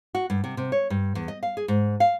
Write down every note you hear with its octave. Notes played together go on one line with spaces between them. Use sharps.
F#4
G2
C3
C3
C#5
G2
E2
D#5
F5
G#4
G#2
F5